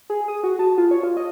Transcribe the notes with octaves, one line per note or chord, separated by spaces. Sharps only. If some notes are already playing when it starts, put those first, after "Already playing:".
G#4
D#6
F#4
A5
F4
C#5
F4
D#5